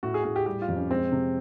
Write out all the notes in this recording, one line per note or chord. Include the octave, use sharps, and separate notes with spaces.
A2 F#4
G#4
A2 G#4
G4
G3 G4
F4
F2
C#4
G#3 C4
C3